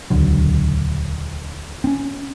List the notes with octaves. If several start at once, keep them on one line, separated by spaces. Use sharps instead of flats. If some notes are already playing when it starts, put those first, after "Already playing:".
D#1 C#2 D3 F#3
C4 C#4